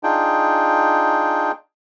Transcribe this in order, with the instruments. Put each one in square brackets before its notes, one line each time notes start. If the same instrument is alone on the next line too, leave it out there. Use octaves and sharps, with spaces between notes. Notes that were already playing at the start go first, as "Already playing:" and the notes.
[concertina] D4 D#4 F4 G#4 G5